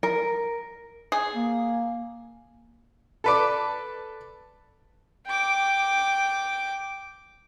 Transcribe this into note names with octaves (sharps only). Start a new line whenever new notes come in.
A#4
G#4
A#3
A4 B4 D5
G5 D6